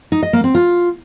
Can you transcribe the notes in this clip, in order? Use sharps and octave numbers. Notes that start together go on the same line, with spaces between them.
D#4
D#5
A#3
C4
F4